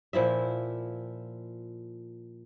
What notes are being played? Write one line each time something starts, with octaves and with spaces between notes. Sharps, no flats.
A#2 F3 E4 E5